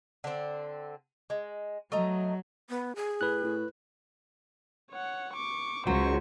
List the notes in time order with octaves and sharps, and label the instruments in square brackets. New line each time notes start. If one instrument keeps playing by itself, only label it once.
[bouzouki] D3 C4
G#3
[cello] F#3 [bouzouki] A3 D#5 A#5
[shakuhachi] B3
G#4
[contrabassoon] A2 [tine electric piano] B4 F#6
[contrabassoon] A2
[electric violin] C#5 F#5
C#6 D6
[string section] C#2 [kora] F#3 [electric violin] C5 C#6